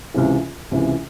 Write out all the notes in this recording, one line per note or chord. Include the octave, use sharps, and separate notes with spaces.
C#2 C3 E3
C#2 C3 E3